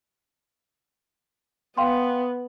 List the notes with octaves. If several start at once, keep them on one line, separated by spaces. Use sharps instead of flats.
B3 F5 G5 C6